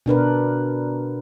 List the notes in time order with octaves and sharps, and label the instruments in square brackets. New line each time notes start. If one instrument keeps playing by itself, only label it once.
[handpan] B2 D4 A#4 B4